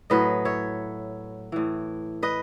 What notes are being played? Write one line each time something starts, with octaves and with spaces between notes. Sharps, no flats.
A2 F#3 B4 D#5
C#5 E5
A2 E3
B4 D#5